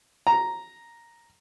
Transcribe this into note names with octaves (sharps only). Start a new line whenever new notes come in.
A#5